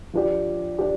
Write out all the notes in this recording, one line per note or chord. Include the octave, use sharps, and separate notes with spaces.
F3 D4 G4
D4 G4